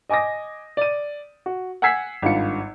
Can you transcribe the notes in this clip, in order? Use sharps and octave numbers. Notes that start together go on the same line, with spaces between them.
D#5 G#5 D6 D#6 A#6
D5 D#7
F#4
F#5 G#5 E6 G#6 B6 C7
G#1 G2 F4 C#7